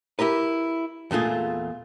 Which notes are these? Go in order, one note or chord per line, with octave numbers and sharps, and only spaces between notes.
E4 G4 A#4 B4
E2 A#2 A3 F4 G#4